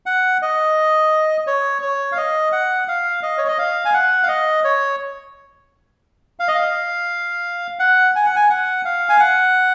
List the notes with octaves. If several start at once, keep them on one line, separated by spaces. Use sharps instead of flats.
F#5
D#5
C#5
C#5
F5
D#5
F#5
F5
D#5
C#5
D#5
F5
G#5
F#5
F5
D#5
C#5
F5
D#5
F5
F#5
G#5
F#5
G#5
F#5
F5
G#5
F#5